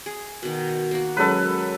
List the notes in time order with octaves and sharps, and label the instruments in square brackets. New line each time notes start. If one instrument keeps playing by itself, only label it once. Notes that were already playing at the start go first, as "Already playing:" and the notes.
[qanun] G#4
B2 D#3
A#3 F#4
[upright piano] F#3 G#3 C#4 [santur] A4 B4